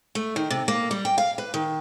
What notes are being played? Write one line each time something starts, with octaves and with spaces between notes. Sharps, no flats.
A3
D#3
C3
A#3
G3
G5
F5
B4
D#3